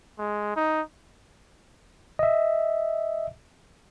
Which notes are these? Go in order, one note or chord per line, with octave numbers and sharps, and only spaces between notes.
G#3
D#4
D#5 E5